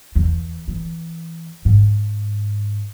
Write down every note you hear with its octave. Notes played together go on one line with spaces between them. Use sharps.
E2
E3
G#2